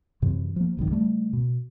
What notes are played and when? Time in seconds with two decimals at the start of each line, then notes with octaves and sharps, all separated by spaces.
0.22 F#2 C3 E3
0.56 F3 A#3
0.77 F1 C2 F#2 D#3
0.91 C#3 G3 A3
1.33 B2